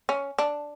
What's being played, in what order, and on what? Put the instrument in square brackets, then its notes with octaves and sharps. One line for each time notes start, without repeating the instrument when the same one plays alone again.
[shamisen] C#4
D4